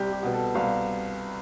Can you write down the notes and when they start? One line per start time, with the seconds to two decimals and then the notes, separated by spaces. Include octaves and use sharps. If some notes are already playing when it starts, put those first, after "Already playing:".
Already playing: C2 G4
0.11 G4
0.23 B2 B3
0.33 A4
0.55 C2 F5